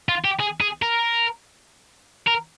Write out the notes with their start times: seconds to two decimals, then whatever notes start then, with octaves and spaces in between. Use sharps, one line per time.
0.09 F4
0.25 G4
0.40 G#4
0.61 G#4
0.82 A#4
2.27 A#4